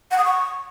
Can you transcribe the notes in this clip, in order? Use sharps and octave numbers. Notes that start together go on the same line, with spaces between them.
F#5
D#6
C#6